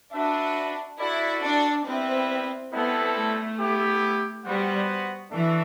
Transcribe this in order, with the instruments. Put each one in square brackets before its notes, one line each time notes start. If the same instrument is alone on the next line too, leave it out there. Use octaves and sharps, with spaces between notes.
[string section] D4 [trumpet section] F#4 B4 E5
[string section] E4 [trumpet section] F#4 A4 D5
[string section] D4
[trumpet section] G3 B3 E4 B4 E5 [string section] C4
[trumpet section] G3 C4 E4 A4 [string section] B3
[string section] A3
[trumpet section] B3 E4 G4
[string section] G3 [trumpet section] B3 F#4 C5 F#5
[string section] E3 [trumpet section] D4 F#4 A4 E5